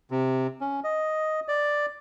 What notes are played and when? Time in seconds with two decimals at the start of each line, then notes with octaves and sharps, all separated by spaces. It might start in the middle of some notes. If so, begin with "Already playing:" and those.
0.11 C3
0.61 C#4
0.84 D#5
1.48 D5